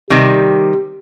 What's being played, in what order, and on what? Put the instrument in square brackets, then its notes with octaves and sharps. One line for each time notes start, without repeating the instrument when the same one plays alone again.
[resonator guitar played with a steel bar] C3 D#3 G3 [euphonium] G4